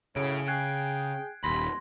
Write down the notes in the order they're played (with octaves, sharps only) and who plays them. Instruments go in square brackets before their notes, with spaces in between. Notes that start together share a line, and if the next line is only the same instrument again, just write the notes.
[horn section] F#2 A2 [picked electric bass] C#3 [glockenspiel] D7
[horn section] G#4 G5 [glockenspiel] F#6 G#6 C7
[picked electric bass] D#1 D#2 [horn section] B5 [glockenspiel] C6 A#6